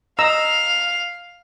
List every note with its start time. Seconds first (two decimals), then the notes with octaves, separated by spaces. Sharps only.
0.19 D#5 F5 A#5 E6